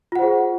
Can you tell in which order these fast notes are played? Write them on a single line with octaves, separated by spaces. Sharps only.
F4 F#5 C5 G#4